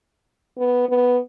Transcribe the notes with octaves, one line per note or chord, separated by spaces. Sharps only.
B3
B3